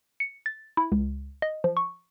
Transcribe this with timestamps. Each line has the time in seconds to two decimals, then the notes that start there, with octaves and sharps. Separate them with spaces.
0.20 C#7
0.46 A6
0.77 E4
0.92 C#2
1.42 D#5
1.64 F3
1.77 C#6